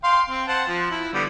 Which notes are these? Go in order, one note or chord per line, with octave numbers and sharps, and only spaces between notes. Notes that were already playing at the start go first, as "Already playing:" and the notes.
F5 G5 C6
C4
C5 F#5 A5
F3
E4
D3 G3 B3